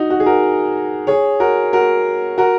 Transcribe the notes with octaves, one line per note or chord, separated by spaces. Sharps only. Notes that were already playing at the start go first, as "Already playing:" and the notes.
Already playing: D#4 F#4
F#4
G#4
F#4 A#4
G#4 C#5
F#4 A#4
F#4 A#4
F#4 A#4